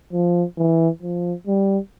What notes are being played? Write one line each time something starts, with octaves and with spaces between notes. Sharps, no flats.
F3
E3
F3
G3